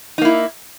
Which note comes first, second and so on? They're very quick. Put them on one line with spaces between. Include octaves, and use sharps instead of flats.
D#4 A#3 E4